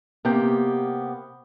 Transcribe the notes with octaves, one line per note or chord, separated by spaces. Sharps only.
C3 A#3 B3 G4 G5